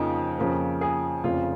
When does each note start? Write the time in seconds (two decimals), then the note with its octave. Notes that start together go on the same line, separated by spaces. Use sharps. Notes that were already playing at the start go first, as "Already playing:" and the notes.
Already playing: F2 C#3 F3 A#3 D#4
0.38 F2 C#3 F3 A#3
0.81 G#4
1.24 F1 F2 C#3 F4